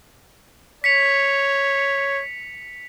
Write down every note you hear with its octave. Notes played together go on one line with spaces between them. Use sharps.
C#5 B6 C#7 F7